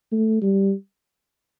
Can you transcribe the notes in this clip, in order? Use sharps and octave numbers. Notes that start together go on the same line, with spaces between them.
A3
G3